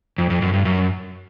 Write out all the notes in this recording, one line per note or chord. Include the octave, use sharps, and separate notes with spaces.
F2
F2
F#2
G2
F#2